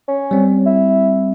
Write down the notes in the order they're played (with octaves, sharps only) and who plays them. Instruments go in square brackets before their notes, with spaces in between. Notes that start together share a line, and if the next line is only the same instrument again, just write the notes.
[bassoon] C#4
[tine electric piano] G3 C4
[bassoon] E4